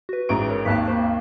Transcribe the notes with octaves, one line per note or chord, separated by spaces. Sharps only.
F#4 B4
A1 G#2 A#5 C#6 D7
A#4 C#5
G#1 D#2 A5 F#6 B6
A#3 C5